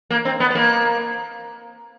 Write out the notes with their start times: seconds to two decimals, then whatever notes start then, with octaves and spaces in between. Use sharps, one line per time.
0.10 A#3
0.25 C4
0.40 B3
0.50 B3
0.55 A#3